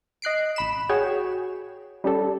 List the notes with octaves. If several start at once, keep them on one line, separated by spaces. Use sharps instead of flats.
D#5 F#6 C7 D7
A1 B5 E7
F#4 G#4 C#5 G5
G3 C#4 G4 A4